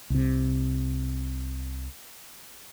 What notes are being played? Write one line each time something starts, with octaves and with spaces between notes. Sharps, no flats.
C2 C3